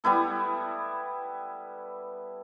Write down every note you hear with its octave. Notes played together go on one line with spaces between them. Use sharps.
G3 B3 E4 A4